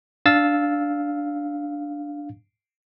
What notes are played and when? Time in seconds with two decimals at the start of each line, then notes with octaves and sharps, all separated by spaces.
0.26 D4 F5 E6 A6